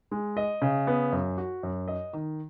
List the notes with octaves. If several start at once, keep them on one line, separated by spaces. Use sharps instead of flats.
G#3
D#5
C#3
B3
F#2
F#4
F#2
D#5
D#3